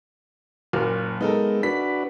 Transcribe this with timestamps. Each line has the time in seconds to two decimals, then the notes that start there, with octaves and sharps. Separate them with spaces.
0.73 F#1 A#2 F6
1.21 G#3 B3 D#4 A4 A#4
1.63 D4 F#4 B4 B6